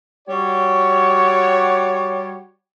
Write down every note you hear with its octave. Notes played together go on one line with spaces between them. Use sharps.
G3 F#4 G4 C#5